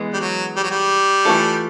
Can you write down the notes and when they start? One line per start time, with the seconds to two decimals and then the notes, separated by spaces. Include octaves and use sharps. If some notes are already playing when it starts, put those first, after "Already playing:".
Already playing: E3 G#3 B3
0.13 G3
0.20 F#3
0.56 G3
0.63 F#3
0.70 G3
1.25 E3 A3 D4 F4 A4